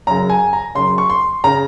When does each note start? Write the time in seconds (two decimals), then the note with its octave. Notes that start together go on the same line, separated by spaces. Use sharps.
0.07 F#2 C#3 A#5
0.30 G#5
0.53 A#5
0.75 F#2 C#3 C6
0.98 C#6
1.10 C6
1.44 C#3 A#5